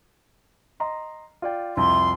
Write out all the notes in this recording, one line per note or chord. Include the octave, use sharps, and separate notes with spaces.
D#5 A#5 C6
F4 D5 G5
C2 F2 E5 C6